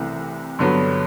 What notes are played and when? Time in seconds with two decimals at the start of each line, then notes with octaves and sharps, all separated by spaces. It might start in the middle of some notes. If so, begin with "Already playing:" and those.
Already playing: C2 C3 E3 A3
0.59 G2 D3 F#3 B3